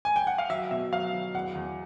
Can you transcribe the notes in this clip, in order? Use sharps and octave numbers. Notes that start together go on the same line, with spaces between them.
G#5
G5
F#5
F5
F#3 E5
B2 E5
F#3 F5
F#3
E2 F#5
E2